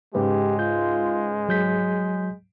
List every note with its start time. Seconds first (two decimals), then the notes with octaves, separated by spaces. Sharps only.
0.14 G#2 C#3 G#3 G4 B4
0.59 F4 G6
1.49 F#3 G#4 G6 B6